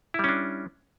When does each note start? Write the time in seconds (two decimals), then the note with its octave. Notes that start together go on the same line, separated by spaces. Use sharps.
0.14 E4
0.19 G3
0.24 C#4
0.29 D4